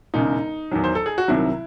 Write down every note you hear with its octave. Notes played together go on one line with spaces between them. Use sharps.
E1 E2 C#3 D#4
E2 D#3 F#3
C5
A4
G#4
F#4
C2 C3 D#3 F#3 E4